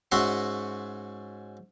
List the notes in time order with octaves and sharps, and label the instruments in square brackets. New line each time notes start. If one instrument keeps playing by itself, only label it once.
[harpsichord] G#2 C#4 F#4 E5 C6